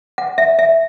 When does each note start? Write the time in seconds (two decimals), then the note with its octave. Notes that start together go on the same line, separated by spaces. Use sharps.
0.18 F#5
0.38 E5
0.59 E5